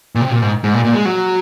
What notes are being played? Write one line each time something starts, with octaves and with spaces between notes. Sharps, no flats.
A#2
C3
A#2
G#2
G#2
A#2
A#2
G#3
F#3